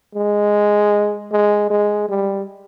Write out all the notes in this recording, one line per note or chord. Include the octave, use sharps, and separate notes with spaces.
G#3
G#3
G#3
G3